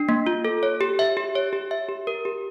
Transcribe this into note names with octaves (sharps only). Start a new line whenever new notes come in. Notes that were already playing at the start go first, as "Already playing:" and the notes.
Already playing: D4
A#3
F4
A4
C#5
G4
E5
G4
C#5
G4
E5
G4
A#4
G4